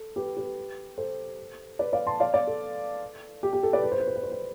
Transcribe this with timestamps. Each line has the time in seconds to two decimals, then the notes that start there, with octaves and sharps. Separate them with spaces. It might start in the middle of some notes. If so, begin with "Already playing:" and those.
Already playing: A4
0.16 G4 B4
0.37 G4 B4
0.98 A4 C5
1.79 B4 D5
1.93 D5 F5
2.07 A5 C6
2.20 D5 F5
2.34 D5 F5
2.47 A4
3.43 G4
3.53 G4
3.63 A4
3.73 B4 D5
3.84 B4
3.92 C5
4.00 B4
4.08 C5
4.16 B4
4.23 C5
4.32 B4